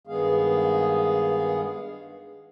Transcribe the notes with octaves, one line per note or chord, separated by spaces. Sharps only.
G2 D#3 G#3 B3 G#4 F5